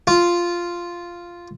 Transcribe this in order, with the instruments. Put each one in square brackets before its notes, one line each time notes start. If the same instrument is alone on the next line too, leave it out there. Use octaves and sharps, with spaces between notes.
[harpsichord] F4